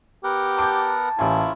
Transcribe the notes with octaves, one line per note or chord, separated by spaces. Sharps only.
B3 G4 A#4 F#5
A5 D6 G6
A1 A#3 C#4 E4 F4 G#5